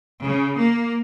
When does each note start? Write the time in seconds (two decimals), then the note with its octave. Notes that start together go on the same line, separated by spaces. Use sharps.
0.22 C#3
0.57 A#3